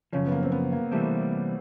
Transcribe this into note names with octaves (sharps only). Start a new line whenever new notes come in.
F#2 C#3 F3 C#4
B3
A#3
C4
B3
A#3
C3 E3 G3 A3 C4